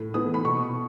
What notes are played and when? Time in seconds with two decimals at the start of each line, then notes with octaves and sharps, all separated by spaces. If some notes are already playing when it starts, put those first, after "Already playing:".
Already playing: A2
0.14 E3 B3 D#6
0.34 B5
0.44 B2 C#6